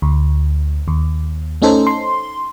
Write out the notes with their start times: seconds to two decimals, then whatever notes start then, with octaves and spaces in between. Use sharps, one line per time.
0.02 D2
0.88 D#2
1.62 A3 C#4 D#4 A4 C5
1.87 C6